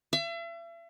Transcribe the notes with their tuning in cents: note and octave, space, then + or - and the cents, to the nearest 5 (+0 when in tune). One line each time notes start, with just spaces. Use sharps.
E5 +40